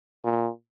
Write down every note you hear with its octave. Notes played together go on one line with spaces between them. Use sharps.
A#2